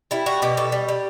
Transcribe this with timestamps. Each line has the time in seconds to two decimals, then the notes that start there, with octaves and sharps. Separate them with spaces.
0.11 G3 E4
0.26 G3 F#4
0.42 B2 G4
0.57 B2 A4
0.72 G3
0.89 G3